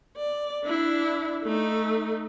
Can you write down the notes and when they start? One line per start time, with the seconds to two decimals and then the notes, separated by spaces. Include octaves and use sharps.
0.17 D5
0.64 D4 E4
1.44 A3 D#4